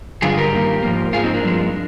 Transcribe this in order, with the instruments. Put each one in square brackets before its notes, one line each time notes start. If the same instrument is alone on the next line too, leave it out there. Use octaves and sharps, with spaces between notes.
[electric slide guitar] G2 D3 G#3 F4 G#4
G4 A#4
G2 D#3 A#3
G#2 F3 A#3
G#2 F3 A#3 F4 G#4
C4 D#4
A#3 D4
G2 F3 G#3